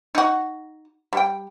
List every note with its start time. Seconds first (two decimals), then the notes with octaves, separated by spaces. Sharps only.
0.15 D#4 F#4
1.13 G3 G5